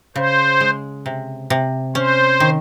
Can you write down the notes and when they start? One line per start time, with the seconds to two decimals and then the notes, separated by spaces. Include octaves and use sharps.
0.16 C#3 C5
0.61 G#3
1.06 C3
1.50 C3
1.95 C#4 C5
2.40 D#3